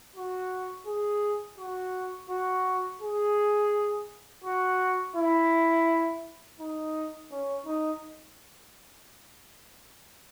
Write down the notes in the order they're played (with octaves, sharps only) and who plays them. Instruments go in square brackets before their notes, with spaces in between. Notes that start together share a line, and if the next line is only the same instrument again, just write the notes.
[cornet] F#4
G#4
F#4
F#4
G#4
F#4
E4
D#4
C#4
D#4